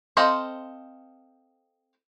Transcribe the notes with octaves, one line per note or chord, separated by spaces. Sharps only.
C4 A4 C5 D#5 F5